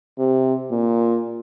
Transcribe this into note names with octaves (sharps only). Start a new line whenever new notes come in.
C3
A#2